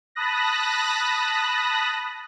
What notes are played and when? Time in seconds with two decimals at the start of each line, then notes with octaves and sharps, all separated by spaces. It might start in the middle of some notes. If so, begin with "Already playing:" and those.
0.15 A5 B5 D#6 F#6 A#6